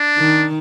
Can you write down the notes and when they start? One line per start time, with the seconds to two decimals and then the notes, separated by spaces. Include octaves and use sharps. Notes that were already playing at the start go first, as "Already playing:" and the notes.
Already playing: D4
0.18 D#3